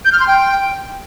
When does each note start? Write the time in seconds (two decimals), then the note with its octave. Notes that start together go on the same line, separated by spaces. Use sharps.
0.05 G6
0.13 F6
0.20 C6
0.27 G5